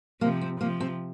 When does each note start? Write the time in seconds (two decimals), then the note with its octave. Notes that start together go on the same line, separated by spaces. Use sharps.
0.21 C3 F3 A#3
0.41 C4
0.60 C3 F3 A#3
0.80 C4